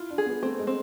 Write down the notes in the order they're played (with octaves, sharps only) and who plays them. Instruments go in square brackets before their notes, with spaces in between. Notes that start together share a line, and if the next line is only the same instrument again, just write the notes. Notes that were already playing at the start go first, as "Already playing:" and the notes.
Already playing: [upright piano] E4 [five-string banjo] F4
[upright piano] D4
[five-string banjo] G#4
[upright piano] B3
[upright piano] A3 [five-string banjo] C4
[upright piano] G#3
[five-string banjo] C4